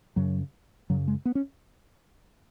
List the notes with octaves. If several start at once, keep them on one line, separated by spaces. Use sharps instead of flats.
F#2 C#3 F#3
F#2 C#3 F#3
G#3
B3
C#4